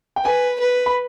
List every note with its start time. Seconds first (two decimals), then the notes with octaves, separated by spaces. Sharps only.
0.16 G5
0.25 B4 G#5
0.60 B4
0.86 B5